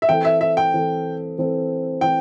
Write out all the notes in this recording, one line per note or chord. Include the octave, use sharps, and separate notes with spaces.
E5
E3 C4 A4 G5
E5
E5
G5
E3 C4 A4
E3 C4 A4
E3 C4 G5